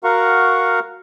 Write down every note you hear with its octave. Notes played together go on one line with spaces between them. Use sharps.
F#4 A#4 F5 F#5 A#5 C#6